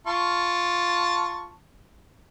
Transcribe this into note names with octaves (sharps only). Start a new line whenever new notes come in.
F4 A5 C#6